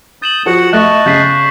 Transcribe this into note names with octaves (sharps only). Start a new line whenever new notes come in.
D#6 G6 A6 E7 F#7
F3 F#4 F#5
A3 D#5 A5 C#6 F#6
C#3 G6 B6 C7